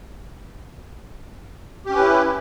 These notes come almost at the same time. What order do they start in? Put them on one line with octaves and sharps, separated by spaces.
G4 C#4 B4 E4